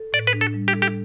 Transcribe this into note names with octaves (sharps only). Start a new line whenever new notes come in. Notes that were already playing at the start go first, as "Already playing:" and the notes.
Already playing: A4
A2 D5
B4
D4
A4
G3
G4
A4
G4